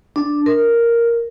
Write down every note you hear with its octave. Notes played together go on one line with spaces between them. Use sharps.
D4
A#4